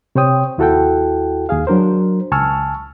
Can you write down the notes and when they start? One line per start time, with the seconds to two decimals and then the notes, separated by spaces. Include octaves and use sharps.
0.15 C3 C5 C#5 G5 D#6
0.58 D#2 E4 F#4 A4 F#5 G5
1.49 D#2 G#4 F5
1.67 F#3 D4 A#4 C5
2.32 C#2 G#5 A5 C#6 E6 F6